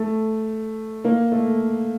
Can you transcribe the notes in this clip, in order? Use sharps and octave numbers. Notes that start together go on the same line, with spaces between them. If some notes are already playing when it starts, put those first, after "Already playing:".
Already playing: A3
A#3
A3